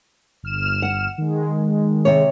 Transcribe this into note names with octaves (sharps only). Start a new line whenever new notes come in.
G1 F6 E7
F#5
D#3 G#3
C3 C#5